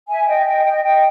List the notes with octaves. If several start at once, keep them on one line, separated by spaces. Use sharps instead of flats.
E5 G#5
D#5 G5
D#5 G5
D#5 G5
D#5 G5